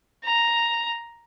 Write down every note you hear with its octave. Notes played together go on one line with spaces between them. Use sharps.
A#5